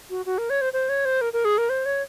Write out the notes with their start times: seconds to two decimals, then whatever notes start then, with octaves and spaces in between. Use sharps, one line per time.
0.10 F#4
0.26 F#4
0.38 A#4
0.50 C#5
0.61 C5
0.73 C5
0.89 C#5
1.05 C5
1.21 A#4
1.33 A#4
1.45 G#4
1.58 A#4
1.69 C5
1.85 C#5